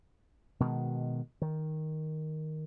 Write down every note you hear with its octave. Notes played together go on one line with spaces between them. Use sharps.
B2 D#3 G#3
D#3